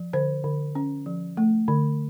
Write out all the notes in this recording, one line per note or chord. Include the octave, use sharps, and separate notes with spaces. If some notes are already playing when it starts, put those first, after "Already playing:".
Already playing: F3
D3 C5
D3
C#4
F3
A3
D3